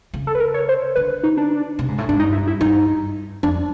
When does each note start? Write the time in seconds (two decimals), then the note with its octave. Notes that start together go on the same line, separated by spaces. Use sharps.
0.14 C#3
0.27 A4
0.35 B4
0.40 A#4
0.54 C#5
0.69 C5
0.95 D3 B4
1.23 D#4
1.37 D4
1.79 C3
1.88 G#2
1.98 A2
2.09 G#2 D4
2.19 G2 D#4
2.32 E4
2.47 E4
2.61 G2 D#4
3.43 F2 D4